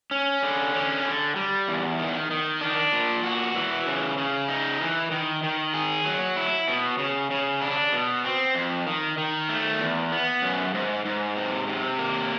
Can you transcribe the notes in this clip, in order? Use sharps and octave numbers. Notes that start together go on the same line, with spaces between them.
C#4
D3
C#4
D3
G3
E2
D#3
D#3
D4
A#2
F#4
E3
C#3
C#3
D#4
E3
D#3
D#3
G#4
F#3
E4
B2
C#3
C#3
D4
B2
C4
F2
D#3
D#3
A3
E2
B3
F#2
G#2
G#2
C3
C3
A#3